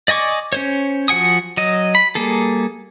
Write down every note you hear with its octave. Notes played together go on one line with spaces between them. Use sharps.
D5 D#5 G#5 C#6 D6
C#4 C5 C#5
F3 F#4 F#5 G#5 D#6
F#3 D#5
B5
G3 A#3 G#4 A4